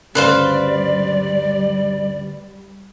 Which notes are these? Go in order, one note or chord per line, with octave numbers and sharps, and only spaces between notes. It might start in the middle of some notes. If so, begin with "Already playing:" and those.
D2 G2 C#3 G3 B4 C5 D5 F5